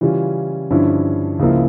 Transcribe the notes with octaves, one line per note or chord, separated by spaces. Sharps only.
C#3 E3 G3 C#4 F4
G2 D3 F3 C#4 E4
C#2 C#3 F3 A#3 E4